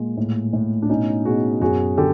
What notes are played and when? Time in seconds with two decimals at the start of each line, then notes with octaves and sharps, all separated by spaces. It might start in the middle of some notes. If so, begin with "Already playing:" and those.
Already playing: A#2 G#3
0.17 A2
0.53 A2
0.82 D4
0.89 B2 C#4 D#4
1.25 B2 F#4 G#4
1.61 F#2 F#4 G#4
1.98 D3 G4 A4